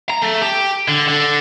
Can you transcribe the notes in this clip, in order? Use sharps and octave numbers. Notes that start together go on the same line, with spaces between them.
A#5
A3
G4
D3
D3